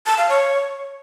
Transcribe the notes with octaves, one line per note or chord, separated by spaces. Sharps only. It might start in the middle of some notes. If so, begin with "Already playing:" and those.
A5
F5
C#5